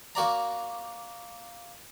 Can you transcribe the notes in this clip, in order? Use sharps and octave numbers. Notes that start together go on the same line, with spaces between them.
A#3 F#4 D5 A#5